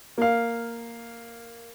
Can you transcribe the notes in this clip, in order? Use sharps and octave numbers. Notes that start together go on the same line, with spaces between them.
A#3 F5